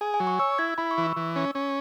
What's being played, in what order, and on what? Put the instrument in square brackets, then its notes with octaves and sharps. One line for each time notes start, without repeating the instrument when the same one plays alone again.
[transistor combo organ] G#4 [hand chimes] G#5
[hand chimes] G#5
[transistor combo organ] F#3
[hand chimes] C#6
[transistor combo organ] C#5 [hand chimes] E6
[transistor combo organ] E4 [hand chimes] G#6
[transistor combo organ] E4 [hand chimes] B5
[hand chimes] C#6
[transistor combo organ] E3
[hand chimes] E6
[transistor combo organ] E3
C#4
C#4